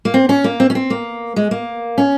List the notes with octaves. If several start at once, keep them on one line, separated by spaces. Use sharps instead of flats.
A#3
C4
C#4
A#3
C4
C#4
C4
A#3
G#3
A#3
C#4